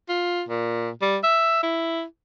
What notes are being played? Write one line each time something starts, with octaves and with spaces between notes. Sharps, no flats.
F4
A#2
G3
E5
E4